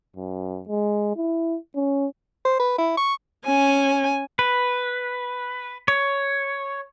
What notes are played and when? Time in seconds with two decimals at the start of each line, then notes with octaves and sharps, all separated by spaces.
0.16 F#2
0.67 G#3
1.16 E4
1.75 C#4
2.45 C5
2.60 B4
2.79 E4
2.98 C#6
3.45 C#4 G#5
4.39 B4
5.88 C#5